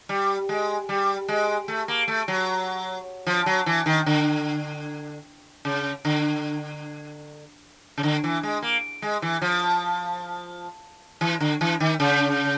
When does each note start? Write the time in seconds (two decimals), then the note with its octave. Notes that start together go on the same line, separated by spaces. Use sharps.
0.09 G3
0.49 G#3
0.89 G3
1.28 G#3
1.68 A3
1.88 A#3
2.08 A3
2.28 F#3
3.26 F3
3.46 F#3
3.66 E3
3.86 D#3
4.06 D3
5.65 C#3
6.05 D3
7.97 C#3
8.03 D3
8.24 E3
8.43 G#3
8.62 A#3
9.02 G#3
9.22 E3
9.42 F3
11.21 E3
11.40 D3
11.61 E3
11.80 D#3
12.00 C#3